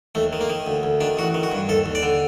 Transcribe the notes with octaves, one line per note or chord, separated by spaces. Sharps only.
D#2 A3
D#3
A#3
D#3
D2
D2
D#3 D4
A1 F#4
D#3
F#4
G2
D#2 A4
D#2
D5
D3